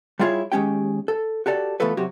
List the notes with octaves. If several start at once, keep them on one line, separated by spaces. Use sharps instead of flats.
G3 E4 F4 G#4 C#5
D#2 G#3 C#4 G4 G5
A4
F#4 G4 A4 D5
E3 A3 B3 F4 A4 B4
C3 F#3 F#4 G4